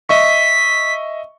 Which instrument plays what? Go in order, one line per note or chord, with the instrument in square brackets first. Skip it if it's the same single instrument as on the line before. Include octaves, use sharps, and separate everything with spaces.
[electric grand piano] D#5 E5 C#6 [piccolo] B6